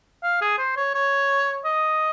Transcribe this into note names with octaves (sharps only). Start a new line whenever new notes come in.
F5
G#4
C5
C#5
C#5
D#5